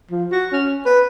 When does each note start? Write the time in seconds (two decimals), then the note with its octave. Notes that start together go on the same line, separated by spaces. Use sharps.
0.11 F3
0.32 F#4
0.53 C#4
0.86 B4